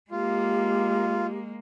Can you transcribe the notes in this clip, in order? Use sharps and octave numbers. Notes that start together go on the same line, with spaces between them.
G#3 A#3 F4 G4